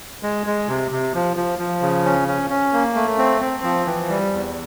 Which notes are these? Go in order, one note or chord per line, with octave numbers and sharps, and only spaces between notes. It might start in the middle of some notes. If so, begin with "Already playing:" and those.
G#3
G#3
C3
C3
F3
F3
F3
C#3
C#4
C#4
C#4
A#3
A3
C4
C4
F3
E3
G3
E2